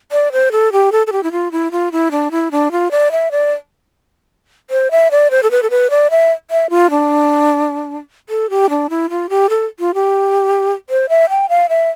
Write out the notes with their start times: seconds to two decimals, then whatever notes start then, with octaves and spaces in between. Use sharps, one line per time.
0.12 D5
0.32 C5
0.52 A4
0.72 G4
0.92 A4
1.07 A4
1.12 G4
1.23 E4
1.32 F4
1.52 E4
1.71 F4
1.92 E4
2.11 D4
2.31 E4
2.51 D4
2.72 F4
2.91 D5
3.12 E5
3.31 D5
4.70 C5
4.91 E5
5.11 D5
5.31 C5
5.43 A4
5.51 B4
5.63 A4
5.70 B4
5.90 D5
6.11 E5
6.51 E5
6.70 F4
6.90 D4
8.29 A4
8.50 G4
8.70 D4
8.90 E4
9.10 F4
9.30 G4
9.50 A4
9.80 F4
9.94 G4
10.90 C5
11.09 E5
11.29 G5
11.49 F5
11.69 E5